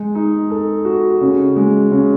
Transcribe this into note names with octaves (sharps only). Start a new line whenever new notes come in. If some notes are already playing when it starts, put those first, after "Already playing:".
Already playing: G#3
D#4
A4
F#4
C#3
G#3
C#3